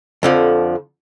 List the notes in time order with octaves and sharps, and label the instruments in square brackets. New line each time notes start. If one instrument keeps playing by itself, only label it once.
[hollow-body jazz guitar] F2 D3 F3